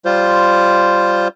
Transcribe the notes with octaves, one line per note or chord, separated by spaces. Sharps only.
G3 F4 C5